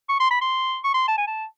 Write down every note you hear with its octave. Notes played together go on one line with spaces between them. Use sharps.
C#6
C6
B5
C6
C#6
C6
A5
G#5
A5